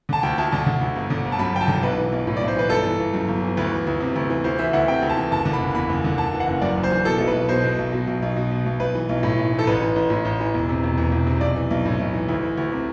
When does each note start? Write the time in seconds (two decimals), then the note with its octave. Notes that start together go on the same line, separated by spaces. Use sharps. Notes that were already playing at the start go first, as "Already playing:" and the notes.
0.09 D3 A5
0.23 D2 G5
0.38 D2 A5
0.52 D3 A5
0.67 D3
0.81 D2
0.96 G1
1.10 D3
1.25 G1
1.32 A5
1.39 F#2 B5
1.54 G1 G5
1.61 A5
1.68 D3
1.83 B1 B4
1.98 E3
2.12 B1
2.27 A2
2.37 B1 D5
2.48 C5
2.56 E3 B4
2.69 G1 A4
2.84 E3
2.99 G1
3.14 F#2
3.28 G1
3.43 E3
3.57 D2 B4
3.72 E3
3.87 D2
4.00 C3
4.16 D2
4.30 E3
4.44 D2 C5
4.59 E3 E5
4.73 D2 F#5
4.88 C3 G5
5.02 D2
5.09 A5
5.17 E3
5.31 F#1 A5
5.45 D3
5.53 B5
5.60 F#1
5.74 E2 B5
5.89 F#1
6.04 D3
6.18 F#1 A5
6.34 E3
6.40 F#5
6.47 F#1
6.62 F#2 D5
6.77 F#1
6.83 C5
6.91 E3
7.05 B2 A4
7.18 B1 A4
7.27 B4
7.34 B1
7.49 B2 C5
7.64 B2
7.78 B1
7.93 B2
8.07 B1
8.22 B1
8.36 B2
8.51 B2
8.66 B1
8.80 B1 B4
8.95 E3
9.09 B1
9.23 A2
9.37 B1
9.53 E3
9.59 A4
9.67 A1 B4
9.81 E3
9.96 A1
10.10 A2
10.25 A1
10.40 E3
10.54 E1
10.69 C3
10.83 E1
10.98 E2
11.12 E1
11.26 C3
11.41 B1 D5
11.56 E3
11.71 B1
11.85 A2
11.99 B1
12.14 E3
12.28 D2
12.43 E3
12.57 D2
12.72 C3